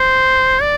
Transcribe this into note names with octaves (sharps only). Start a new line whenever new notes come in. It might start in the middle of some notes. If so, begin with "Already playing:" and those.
Already playing: C5
D5